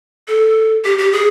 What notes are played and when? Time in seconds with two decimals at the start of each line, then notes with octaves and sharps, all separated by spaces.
0.28 A4
0.84 G4
0.98 G4
1.12 G#4